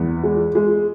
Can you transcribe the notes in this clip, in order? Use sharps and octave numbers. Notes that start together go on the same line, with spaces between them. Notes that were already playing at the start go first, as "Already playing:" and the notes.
Already playing: E2 B3
G#3
G#3